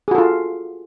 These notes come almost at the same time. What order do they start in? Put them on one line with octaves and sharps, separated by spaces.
G#4 F#4 A4 F4